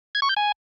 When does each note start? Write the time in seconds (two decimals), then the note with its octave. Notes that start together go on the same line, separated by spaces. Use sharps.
0.15 G#6
0.22 C#6
0.29 G6
0.37 G#5